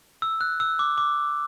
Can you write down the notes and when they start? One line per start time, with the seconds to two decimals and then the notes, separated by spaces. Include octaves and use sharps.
0.22 E6
0.41 F#6
0.60 E6
0.79 D6
0.98 D6